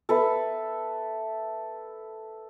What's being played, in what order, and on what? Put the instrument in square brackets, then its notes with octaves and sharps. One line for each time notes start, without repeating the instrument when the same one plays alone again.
[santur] A4 B4 E5